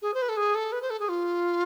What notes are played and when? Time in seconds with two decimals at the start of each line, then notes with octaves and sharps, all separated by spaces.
0.01 G#4
0.13 C5
0.21 B4
0.28 A4
0.36 G#4
0.54 A4
0.72 B4
0.81 C5
0.90 A4
0.99 G#4
1.08 F4